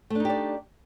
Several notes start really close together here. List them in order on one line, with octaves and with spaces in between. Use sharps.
A3 D4 D#4 G4 D5